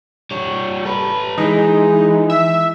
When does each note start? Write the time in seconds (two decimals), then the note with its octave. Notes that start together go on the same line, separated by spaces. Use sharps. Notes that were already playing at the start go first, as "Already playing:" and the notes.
0.31 G3 C#5
0.85 A4 B4
1.38 E3 G#3 D#4
2.30 E5